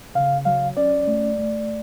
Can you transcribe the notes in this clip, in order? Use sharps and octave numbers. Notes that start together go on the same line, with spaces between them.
C#3 F5
F#3 F5
C#4 D5
A3
A3